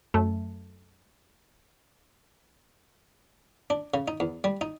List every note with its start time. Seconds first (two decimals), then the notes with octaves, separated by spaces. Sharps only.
0.14 F#2 A3
3.70 D4
3.94 C#3
4.08 D#4
4.20 E2
4.44 G3
4.61 D#4